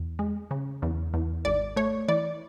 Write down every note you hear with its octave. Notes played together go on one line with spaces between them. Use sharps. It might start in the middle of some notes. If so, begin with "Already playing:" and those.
Already playing: E2
G#3
C#3
E2
E2
G#1 D5
A3 C#5
E3 D5